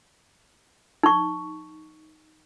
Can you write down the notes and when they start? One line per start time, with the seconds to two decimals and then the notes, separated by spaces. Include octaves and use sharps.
1.03 D#4 C#6